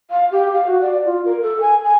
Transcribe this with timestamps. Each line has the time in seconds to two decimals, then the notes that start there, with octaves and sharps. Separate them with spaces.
0.11 F5
0.32 G4
0.54 F5
0.66 F#4
0.81 D5
1.05 F4
1.25 A#4
1.42 A4
1.61 G#5
1.83 G#5